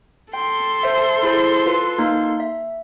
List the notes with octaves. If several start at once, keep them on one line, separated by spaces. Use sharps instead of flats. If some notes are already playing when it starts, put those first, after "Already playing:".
A4 G5 C6
C5 E5
E4 G#4 C5
F4 B4
A#3 D#4
E5